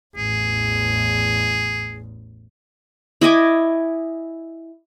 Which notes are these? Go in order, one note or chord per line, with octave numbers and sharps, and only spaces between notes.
A1 E2 G#4
E4 D#5 G#5 D6